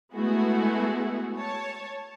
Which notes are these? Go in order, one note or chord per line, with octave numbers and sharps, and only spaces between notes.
G#3 A3 B3 E4 F#4 G#4
C#5 A5